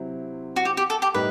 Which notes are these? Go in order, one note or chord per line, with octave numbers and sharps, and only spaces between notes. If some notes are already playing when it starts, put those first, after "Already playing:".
Already playing: C3 F#3 C4 E4
F#4
G4
G4
A4
G4
A2 G3 D#4 B4